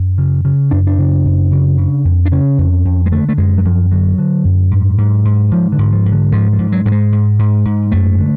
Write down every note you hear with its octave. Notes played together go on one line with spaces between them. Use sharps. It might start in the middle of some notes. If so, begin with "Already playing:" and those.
Already playing: F#2
C#3
C#3
F#2 D4
D4
C#3
F#2
C#3
C#3
F2
D4
C#3 C#4
F2
F2
G#3
D3 A3
A3
F#2 G#3
F#3
F#2 F3
D3 F#3
D3
F#2
G#2
G#2
G#2
G#2 F3
D3
G#2
F3
G#2
D3
G#2 F3
F3
G#2
F#3
G#2 F#3
G#3
G#2
G#2
G#2
F#2 A3
D3